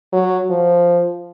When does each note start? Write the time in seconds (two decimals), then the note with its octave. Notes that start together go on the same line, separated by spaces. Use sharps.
0.12 F#3
0.50 F3